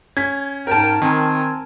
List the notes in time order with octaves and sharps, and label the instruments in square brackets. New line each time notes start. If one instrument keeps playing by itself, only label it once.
[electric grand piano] C#4 B6 [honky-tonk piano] G#6
[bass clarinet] G#2 [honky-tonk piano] A#4 A5 [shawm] G5
[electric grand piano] D#3 [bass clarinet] C4 [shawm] G#5